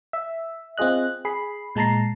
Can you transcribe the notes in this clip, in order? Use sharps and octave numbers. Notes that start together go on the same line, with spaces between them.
E5
C4 F4 G#4 D#5 F#6
G#4 B5 C7
A#2 G#3 A5 A#5 C7